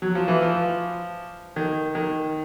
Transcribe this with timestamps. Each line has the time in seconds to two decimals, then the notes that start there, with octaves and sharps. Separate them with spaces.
0.02 F#3
0.15 F3
0.28 E3
0.42 F3
1.56 D#3
1.95 D#3